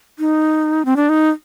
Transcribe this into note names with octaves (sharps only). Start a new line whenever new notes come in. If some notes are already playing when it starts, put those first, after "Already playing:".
D#4
C4
D4
D#4